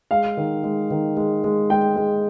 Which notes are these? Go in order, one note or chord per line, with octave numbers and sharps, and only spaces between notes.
G#3 F5
D#3
G#3
D#3
G#3
G#3
G#3 G5
G#3